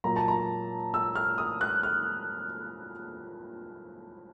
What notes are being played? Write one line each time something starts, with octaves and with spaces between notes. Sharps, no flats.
A#2 F#3 A#3 A#5
A5
A#5
E6
F6
D#6
F#6
F6